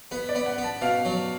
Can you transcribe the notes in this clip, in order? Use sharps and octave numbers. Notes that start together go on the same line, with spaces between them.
B3 B4
D5
B3
F#5
B3
A5
B2 F5
F#3